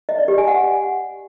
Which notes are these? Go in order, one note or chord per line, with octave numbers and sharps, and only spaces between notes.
D#5
D5
G4
G#5
F#5